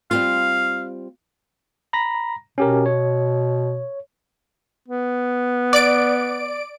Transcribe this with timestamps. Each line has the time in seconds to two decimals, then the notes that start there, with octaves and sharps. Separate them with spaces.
0.11 G3 C4 F4 F5
1.93 A#5 B5 A#6
2.58 B2 C#4 G4 A#4
2.86 C#5
4.88 B3
5.73 D5 D7